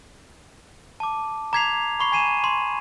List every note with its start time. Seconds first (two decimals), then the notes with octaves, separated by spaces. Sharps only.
1.00 A5 D6
1.53 A#5 D6 G#6 B6 C7 F7
2.00 B5 C#6 C7
2.12 G#5 G#6 C7 D#7 E7
2.44 C6